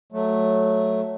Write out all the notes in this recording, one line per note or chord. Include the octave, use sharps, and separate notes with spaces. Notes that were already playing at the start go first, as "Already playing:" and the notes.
F#3 A3